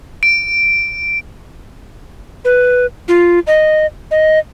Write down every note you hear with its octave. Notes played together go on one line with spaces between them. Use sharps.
D7
B4
F4
D#5
D#5